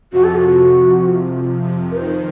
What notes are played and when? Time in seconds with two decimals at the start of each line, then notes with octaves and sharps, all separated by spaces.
0.12 F2 C3 F3 F#4
0.24 A4
0.35 F#4
1.91 A#4
1.97 F2 D#3 C5